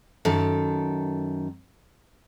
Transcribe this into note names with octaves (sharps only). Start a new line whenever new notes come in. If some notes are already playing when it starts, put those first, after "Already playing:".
F#2 D#3 A4